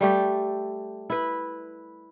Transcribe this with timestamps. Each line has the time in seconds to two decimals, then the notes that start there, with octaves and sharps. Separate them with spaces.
0.01 G3 A3 G4
1.10 E4 B4